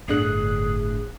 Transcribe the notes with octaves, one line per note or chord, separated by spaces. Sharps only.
G1 A2 D3 G#4 F#6